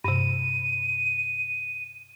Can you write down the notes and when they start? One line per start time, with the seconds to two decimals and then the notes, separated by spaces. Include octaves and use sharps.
0.04 G2 C3 D#7